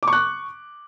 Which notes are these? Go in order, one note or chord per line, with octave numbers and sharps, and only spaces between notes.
C#6 D6 F#6